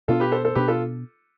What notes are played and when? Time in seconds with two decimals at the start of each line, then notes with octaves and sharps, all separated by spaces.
0.08 B2 B3 D4 F4 A4
0.20 G4 B4
0.32 A4 C5
0.45 A4 C5
0.55 B2 B3 D4 G4 B4
0.68 F4 A4